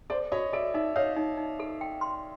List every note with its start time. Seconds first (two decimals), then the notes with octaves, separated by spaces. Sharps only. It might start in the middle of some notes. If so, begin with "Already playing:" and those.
0.10 A4 C5 D5
0.31 F#4 C#5 D#5
0.53 A4 D5 E5
0.74 D#4 D5 E5
0.96 C#5 D#5 F5
1.17 D#4
1.38 D#4
1.60 A4
1.81 G5
2.01 C6